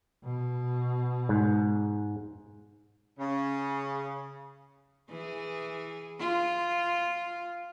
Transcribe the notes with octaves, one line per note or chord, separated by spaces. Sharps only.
B2
G#2
C#3
E3 G#4
F4